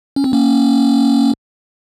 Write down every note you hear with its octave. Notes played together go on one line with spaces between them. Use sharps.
C#4
C4
A#3 C#4